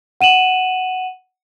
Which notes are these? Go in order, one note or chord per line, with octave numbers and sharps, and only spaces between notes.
F#5 D#7 E7 F#7